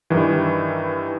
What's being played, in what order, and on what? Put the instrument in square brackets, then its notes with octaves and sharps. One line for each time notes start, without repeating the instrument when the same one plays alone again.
[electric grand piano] G2 D#3 E3